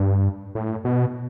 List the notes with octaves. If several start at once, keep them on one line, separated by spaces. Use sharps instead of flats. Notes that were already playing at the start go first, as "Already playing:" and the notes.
Already playing: G2
A2
B2